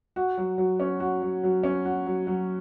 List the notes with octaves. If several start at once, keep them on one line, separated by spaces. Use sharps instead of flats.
F#4
F#3
F#3
C#4
F#4
F#3
F#3
C#4
F#4
F#3
F#3